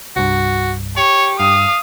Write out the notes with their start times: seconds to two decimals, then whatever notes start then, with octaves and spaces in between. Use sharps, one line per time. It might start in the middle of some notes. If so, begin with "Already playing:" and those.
0.16 C2 G2 F#4
0.97 G4 C#5 C#6
1.40 G2 F5 D#6